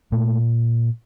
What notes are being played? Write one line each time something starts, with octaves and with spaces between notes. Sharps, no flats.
A#2 A3